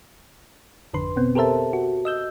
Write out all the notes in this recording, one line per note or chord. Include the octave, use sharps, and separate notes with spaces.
G#1 F2 D3 B4 C6
B2 B3 C4
G4 A4 A#4 C5 E5 A5
F#4
D#5 E6 G6